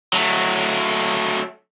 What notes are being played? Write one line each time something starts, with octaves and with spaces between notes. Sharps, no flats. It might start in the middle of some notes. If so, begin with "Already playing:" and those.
F#3 A3